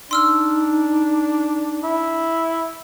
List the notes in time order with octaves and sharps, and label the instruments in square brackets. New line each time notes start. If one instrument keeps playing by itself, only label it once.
[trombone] D4 [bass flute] D#4 [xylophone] C6 E6 F6
[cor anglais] E4